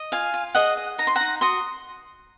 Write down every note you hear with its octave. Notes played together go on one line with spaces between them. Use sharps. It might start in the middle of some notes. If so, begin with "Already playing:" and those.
Already playing: D#5
F4 F5 G#5
F4
G#4 D#5 F#5
D#5
D#4 A#5
C6
D#4 F#5 A#5
F#4 C6 D#6